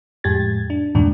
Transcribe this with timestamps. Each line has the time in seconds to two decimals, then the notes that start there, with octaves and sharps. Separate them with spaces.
0.24 F2 A2 G#3 G4 G#6 A6
0.70 D4
0.95 E2 G2 A#2 D#3 G#3 D4